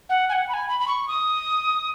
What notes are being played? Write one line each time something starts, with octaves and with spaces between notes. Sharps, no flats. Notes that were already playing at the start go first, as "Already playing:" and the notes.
F#5
G#5
F#5
B5
G#5
B5
B5
C#6
D#6